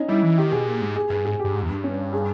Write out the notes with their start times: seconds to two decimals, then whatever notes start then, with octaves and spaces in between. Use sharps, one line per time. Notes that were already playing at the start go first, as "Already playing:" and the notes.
Already playing: C#4 D#4
0.08 G3 E4
0.23 E3
0.37 D#3 G4
0.52 B2 G#4
0.67 A#2
0.81 G#2
0.96 G#4
1.10 G2 G#4
1.25 G#2 G#4
1.39 G2 G4
1.54 G#2
1.62 E2
1.69 G2
1.84 C#4
2.13 G#4